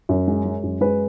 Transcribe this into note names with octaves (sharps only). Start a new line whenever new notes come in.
F#2
G#3
G#3
F#2
G#3 B4